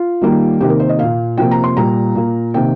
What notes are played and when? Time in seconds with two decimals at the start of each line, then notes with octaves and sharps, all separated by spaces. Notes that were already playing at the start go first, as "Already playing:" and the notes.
Already playing: F4
0.21 D#3 G3 A#3
0.60 C3 D#3 A#3 G4
0.69 A#4
0.80 C5
0.89 D#5
0.98 A#2 A#3 F5
1.38 C3 F3 A#3 G5
1.51 A#5
1.64 C6
1.77 A#2 G3 A#3 A#5
2.15 A#2 A#3
2.54 C3 D#3 A#3 G5